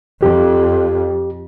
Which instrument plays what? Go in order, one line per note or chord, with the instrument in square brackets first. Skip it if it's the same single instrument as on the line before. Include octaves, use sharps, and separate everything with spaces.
[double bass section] F2 [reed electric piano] G4